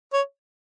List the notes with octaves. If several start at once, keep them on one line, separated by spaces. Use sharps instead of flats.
C#5